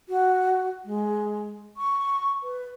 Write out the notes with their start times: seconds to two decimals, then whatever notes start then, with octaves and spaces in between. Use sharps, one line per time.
0.09 F#4
0.85 G#3
1.77 C#6
2.43 B4